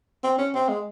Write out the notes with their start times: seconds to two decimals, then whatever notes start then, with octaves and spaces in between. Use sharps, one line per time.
0.23 C4
0.38 C#4
0.54 C4
0.69 G#3